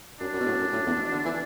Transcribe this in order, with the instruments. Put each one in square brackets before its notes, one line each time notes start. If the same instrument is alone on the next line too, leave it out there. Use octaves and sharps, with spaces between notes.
[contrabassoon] F#2 [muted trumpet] D4
[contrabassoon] F#2
B2
A2
F#2
A2
E2
B2
D3
E3